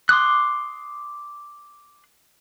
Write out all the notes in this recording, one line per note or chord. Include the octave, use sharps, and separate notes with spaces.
C6 D6 D#6 F#6